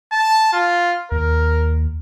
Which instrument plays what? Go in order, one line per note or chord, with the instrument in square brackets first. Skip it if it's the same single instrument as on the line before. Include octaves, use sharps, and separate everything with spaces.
[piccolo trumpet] A5
F4
[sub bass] D#2 [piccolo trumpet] A#4